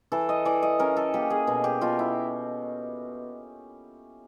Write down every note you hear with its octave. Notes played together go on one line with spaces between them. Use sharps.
E3 A4
D#5
E3 D5
D#5
C#4 A#4
A4
A#3 G4
G#4
B2
G4
B2 F4
E4